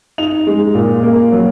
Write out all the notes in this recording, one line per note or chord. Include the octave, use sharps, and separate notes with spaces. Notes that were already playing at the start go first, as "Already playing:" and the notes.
D#4 F7
G#3
A#2
A#3
F#3